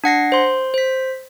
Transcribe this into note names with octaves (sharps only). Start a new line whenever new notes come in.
D4 F#5 A#6 C7
C5 C6
C5 B6